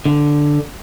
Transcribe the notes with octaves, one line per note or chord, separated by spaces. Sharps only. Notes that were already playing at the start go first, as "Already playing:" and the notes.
D3